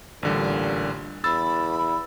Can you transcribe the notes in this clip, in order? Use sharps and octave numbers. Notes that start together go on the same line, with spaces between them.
A1 A#2 D3 G3
E2 B5 E6 A6